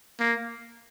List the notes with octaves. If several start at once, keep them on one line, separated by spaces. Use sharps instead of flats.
A#3